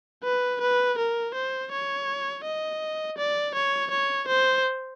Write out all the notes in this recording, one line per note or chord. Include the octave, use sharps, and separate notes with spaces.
B4
B4
A#4
C5
C#5
D#5
D5
C#5
C#5
C5